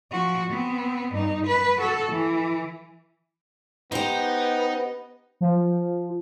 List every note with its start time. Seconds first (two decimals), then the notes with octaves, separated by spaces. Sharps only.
0.11 F3 F#4
0.50 B3 C4
1.14 G2 D#4
1.47 B4
1.78 F#4 A4
2.12 E3
3.92 B3 D#4 G4 C5
5.41 F3